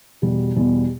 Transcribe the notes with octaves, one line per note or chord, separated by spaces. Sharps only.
E2 B2 G3 G4
E2 B2 G3 G4